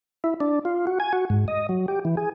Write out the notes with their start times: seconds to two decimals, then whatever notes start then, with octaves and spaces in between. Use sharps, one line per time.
0.24 E4
0.40 D4
0.65 F4
0.87 F#4
1.00 G#5
1.13 F#4
1.30 G#2
1.48 D#5
1.69 F#3
1.88 G4
2.05 E3
2.17 G#4